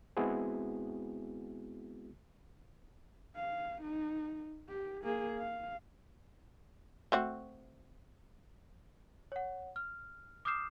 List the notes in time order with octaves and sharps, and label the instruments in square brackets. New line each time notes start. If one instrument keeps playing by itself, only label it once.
[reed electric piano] G#3 B3 C4 E4 F#4 G#4
[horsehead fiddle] F5
D#4
G4
A#3 G#4
F5
[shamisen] A3 C4 F#4
[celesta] C#5 F#5
F6
D6 D#6 F6 G6 C7 E7